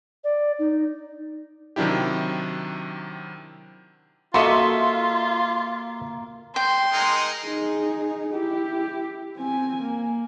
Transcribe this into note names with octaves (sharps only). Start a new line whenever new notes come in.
D5
D#4
C3 D#3 F#3 D4 E4 G4
A#3 F4 F#4 A4 D#5 E5 C6
G5 C6
G#3 D#4 A#4
D#4 G#4
E4 G4
C4 G#5
A#3